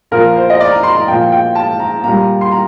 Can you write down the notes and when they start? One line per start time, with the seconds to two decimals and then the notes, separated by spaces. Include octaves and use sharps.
0.11 A#2 F3 A#4
0.36 C5
0.50 D#5
0.60 D5
0.71 A#5
0.83 C6
0.96 A#5
1.08 A#2 F3 G5
1.32 G5
1.55 A5
1.79 A#5
2.03 A#2 G3 A#5
2.41 C6
2.51 A#5